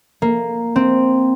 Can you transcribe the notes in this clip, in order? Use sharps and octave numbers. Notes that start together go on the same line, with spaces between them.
A#3
C4